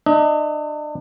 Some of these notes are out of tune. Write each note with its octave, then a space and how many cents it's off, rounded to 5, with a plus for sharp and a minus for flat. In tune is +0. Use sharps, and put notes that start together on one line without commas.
D4 +40 D#5 +35